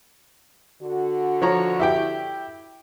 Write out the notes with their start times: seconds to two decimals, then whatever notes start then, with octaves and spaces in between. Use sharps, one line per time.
0.82 D3 F#4
1.42 F3 C#5 A#5
1.80 E4 G4 G5